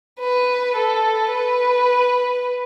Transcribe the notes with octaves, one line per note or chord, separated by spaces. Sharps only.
B4
A4
B4